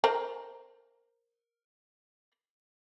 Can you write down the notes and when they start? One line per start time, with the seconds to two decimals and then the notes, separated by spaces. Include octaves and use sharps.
0.04 A#4 C5 A#5